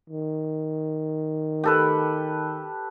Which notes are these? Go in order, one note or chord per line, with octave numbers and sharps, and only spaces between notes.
D#3
G4 A4 B4